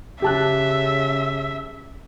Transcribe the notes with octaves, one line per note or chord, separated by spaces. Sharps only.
C#3 G4 E5 A5 F#6